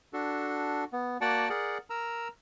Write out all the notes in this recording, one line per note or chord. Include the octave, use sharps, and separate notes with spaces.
D4 F#4 A4
B3
A#3 F#4 D5 F#5 G5 A5
G#4 A#4 D5 F#5
A#4 A#5 E6